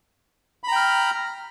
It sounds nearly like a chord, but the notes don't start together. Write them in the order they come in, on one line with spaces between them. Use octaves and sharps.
B5 A#5 G5 F6